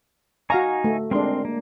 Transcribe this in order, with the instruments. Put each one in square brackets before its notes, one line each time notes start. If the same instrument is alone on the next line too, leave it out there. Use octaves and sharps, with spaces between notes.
[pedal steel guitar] D#4 G#5 C#6 [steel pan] F#4 F5 A#5
[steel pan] A3
[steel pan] G#3 D4 [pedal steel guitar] C4 A#4 C6
[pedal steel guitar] A#3